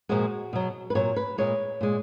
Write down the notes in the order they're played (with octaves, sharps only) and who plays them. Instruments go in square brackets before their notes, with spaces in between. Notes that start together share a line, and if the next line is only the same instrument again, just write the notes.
[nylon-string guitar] A#2 F3 G#3 F#4
B2 F#3
B4
A#2 F#3 C#5
B4
A#2 G#3 C#5
A#2 G#3